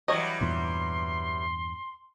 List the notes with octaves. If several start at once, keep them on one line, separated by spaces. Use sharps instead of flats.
E3 F#3 G3 C#5 D#5
E2 G2 A#2 C6